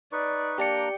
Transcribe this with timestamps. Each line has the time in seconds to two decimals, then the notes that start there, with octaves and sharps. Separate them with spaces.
0.12 D#4 B4 D5 C#6
0.58 A#3 D4 G4 D5 G5 A#5 C#7